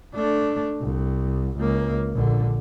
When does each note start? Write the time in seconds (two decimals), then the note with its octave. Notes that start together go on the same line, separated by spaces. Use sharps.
0.15 A3 D4
0.80 C2
1.58 C#2 A#3
2.14 A#1 D3